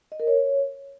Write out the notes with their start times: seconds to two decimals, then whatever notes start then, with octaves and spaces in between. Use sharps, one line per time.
0.12 D#5
0.20 A#4
0.27 C#5